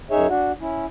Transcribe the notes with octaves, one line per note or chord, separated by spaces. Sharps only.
F#2 D#4 G#4 C#5 E5
D4 F#4
C#4 E4